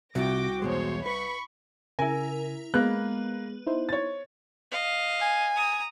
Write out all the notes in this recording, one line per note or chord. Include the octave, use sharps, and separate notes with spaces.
C2 C3 F4 F#4 G5 D6 A#6
E2 B2 G#3 C5 C#5
B4 B5 C#6
C#3 E4 A#4 G#5
G#3 A#3 B3 F#6
D#4 E4 C5
C#5 A6
D#5 F5
G#5
A#5 D#6